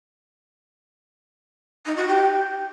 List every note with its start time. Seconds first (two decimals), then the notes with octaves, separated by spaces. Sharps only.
1.86 D#4
1.97 F#4
2.07 G4